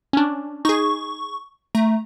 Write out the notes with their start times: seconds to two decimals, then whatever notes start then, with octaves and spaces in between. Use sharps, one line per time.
0.13 C#4 D4
0.65 D#4 G#4 C#6
1.75 A3 A#5